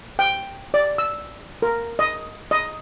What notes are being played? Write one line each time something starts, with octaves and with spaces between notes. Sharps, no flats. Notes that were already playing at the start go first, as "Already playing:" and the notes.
G5
D5
E6
A#4
D#5
D#5